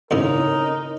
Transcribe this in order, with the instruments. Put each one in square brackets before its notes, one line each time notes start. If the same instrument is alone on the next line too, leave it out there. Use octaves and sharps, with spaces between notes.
[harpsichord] D2 A2 C#3 [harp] C4 C#4 [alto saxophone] D#4 [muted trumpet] A#4